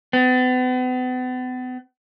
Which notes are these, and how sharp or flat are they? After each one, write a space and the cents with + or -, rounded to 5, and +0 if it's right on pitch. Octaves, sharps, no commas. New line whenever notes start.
B3 +40